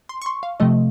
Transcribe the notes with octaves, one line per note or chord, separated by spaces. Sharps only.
C6
C#6
C6
F5
C3 F3 A3 D#5